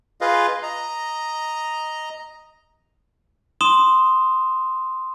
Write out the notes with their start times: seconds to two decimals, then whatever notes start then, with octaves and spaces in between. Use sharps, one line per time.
0.21 F4 G#4 B4 D#5 F5
0.63 D#5 A#5
3.61 C6 D#6 E7 G7